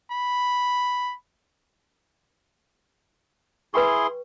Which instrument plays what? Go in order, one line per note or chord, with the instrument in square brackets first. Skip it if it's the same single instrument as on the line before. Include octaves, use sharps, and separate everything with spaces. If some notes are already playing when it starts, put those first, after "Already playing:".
[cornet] B5
[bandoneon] E4 G#4 C6 [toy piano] B4 G5 C#6